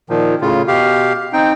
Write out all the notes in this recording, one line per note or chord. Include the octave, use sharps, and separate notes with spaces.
A#2 D#3 F3
A2 C#3 F4
B2 G4 F5
C4 D#4 G5